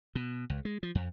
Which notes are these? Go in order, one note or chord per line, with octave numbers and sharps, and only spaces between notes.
B2
C#2
G#3
F3
F2